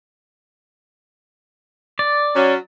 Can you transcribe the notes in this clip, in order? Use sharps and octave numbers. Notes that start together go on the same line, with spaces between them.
D5
F#3 C#4